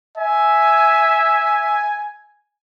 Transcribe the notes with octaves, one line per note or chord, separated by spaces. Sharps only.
E5 G#5